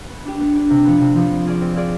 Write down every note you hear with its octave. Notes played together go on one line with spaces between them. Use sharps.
B3
D4 G4
B3
D4 G4
C3
F3 B3
C3
F3 B3
C4
F4 G#4 D5
C4
F4 G#4 D5